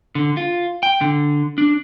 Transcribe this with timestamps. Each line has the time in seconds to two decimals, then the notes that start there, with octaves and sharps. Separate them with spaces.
0.15 D3
0.37 F4
0.83 G5
1.01 D3
1.58 D4